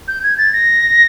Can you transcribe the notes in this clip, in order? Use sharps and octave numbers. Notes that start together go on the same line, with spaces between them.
G6
G#6
A6
A#6